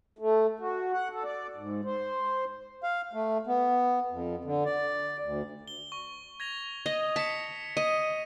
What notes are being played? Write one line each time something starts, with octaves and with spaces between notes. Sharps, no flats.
A3
F#4
F#5
A4
D5
G#2
C5
F5
A3
B3
F2
D3
D5
D2
G7
C#6
G#6 A#6 F7
D#5
A5 B6 C#7
D#5 D#7